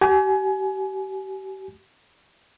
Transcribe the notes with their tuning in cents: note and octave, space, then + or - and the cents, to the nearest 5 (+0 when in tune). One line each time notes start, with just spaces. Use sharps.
G4 -35 G#5 +25